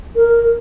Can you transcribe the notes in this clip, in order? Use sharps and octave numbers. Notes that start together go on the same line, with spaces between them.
A#4